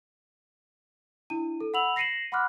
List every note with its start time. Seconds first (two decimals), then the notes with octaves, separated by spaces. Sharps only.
1.30 D4 E4 D#7
1.61 A4
1.74 F#5 B5 E6 F7 F#7
1.96 A#6 C7 C#7 D#7 E7 F#7
2.32 F#5 B5 C6 D6 F6 F#6